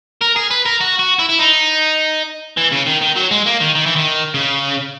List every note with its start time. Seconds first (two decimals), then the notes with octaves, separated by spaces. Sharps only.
0.21 A#4
0.36 G#4
0.51 B4
0.66 A#4
0.81 F#4
0.99 F#4
1.19 E4
1.29 E4
1.39 D#4
2.57 E3
2.72 C#3
2.87 D#3
3.02 D#3
3.16 F#3
3.31 G#3
3.46 A#3
3.60 D#3
3.75 D#3
3.86 E3
3.96 D#3
4.34 C#3